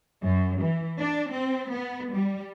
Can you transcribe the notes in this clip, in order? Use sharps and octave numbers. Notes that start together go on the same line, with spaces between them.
F#2
E3
D4
C4
B3
G3